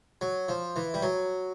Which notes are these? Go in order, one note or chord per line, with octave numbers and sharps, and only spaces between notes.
F#3
F3
E3
G3
F#3